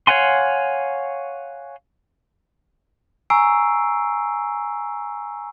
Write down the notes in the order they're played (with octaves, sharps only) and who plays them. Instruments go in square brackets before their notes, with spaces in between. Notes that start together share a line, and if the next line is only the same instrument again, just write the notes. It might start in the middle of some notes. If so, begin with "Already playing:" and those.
[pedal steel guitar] C#5 F5 F#5 G#5 C6
[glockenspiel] G#5 A#5 C#6 E6 C7 D7